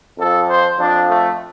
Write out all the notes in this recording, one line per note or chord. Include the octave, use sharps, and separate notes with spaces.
F2 F3 A4
C5
F2 F3 D4
A3